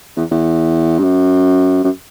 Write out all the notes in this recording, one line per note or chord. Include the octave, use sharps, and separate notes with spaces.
E2
E2
G2
F#2
F#2